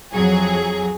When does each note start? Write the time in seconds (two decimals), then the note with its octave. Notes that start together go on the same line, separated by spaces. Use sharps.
0.13 F2 F#3 G#4